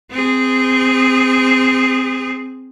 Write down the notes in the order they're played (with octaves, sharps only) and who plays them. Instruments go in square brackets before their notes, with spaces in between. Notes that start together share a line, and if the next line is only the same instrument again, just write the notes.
[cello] C4 G#4